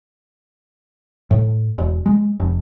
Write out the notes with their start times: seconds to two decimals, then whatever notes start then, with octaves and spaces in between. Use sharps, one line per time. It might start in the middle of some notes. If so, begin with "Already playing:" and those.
1.31 A2
1.78 E1
2.06 G#3
2.40 F1